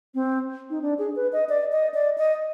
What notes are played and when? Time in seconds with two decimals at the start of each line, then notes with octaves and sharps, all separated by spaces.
0.15 C4
0.70 D#4
0.82 D4
0.99 G#4
1.16 B4
1.33 D#5
1.49 D5
1.72 D#5
1.94 D5
2.18 D#5